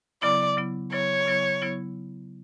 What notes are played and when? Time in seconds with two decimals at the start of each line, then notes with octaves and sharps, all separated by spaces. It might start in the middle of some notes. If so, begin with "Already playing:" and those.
0.22 C#3 F#3 B3 E4 D5
0.57 C#3 F#3 B3 E4
0.92 C#3 F#3 B3 E4 C#5
1.27 C#3 F#3 B3 E4
1.62 C#3 F#3 B3 E4